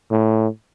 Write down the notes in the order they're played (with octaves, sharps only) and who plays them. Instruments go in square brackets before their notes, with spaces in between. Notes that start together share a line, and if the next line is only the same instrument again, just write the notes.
[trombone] A2